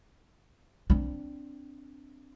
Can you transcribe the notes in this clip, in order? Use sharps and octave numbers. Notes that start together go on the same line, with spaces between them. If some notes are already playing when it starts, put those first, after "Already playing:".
C4 D4